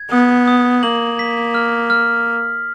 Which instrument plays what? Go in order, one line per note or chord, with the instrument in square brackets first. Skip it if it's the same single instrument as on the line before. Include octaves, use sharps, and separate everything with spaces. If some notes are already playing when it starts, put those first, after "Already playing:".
Already playing: [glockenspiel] G#6
[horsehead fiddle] B3 [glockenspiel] D#6
[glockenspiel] D#6
[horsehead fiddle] A#3 [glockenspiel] F#7
[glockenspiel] B6
F6
F6